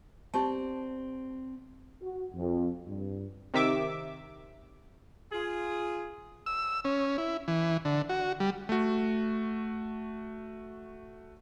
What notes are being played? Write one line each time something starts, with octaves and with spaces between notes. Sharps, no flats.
C4 G4 D5 A5
F#4
F2
G2
C3 D#3 E5 D6
F4 G#4
E6
C#4
E4
E3
D3
F#4
G3
A3 F#4